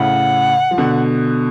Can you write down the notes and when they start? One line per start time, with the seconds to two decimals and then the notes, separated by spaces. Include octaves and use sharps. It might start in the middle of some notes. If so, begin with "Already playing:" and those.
Already playing: A2 C#3 F#5
0.71 F3
0.78 B2 D3